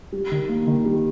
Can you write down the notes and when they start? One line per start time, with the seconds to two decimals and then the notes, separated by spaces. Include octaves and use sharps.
0.12 G3
0.31 D#3
0.49 A#3
0.67 D#3
0.85 G3